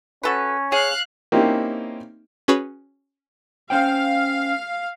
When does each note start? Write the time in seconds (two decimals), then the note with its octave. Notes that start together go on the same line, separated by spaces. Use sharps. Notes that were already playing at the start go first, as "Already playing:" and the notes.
0.23 C#4 F#4 A4 B4
0.72 G#4 C#5 F5 F#6
1.32 A#3 C4 C#4 D#4 E4 G4
2.48 C#4 F#4 G#4 B4 C#5 B5
3.70 C#4 C5 F5 G5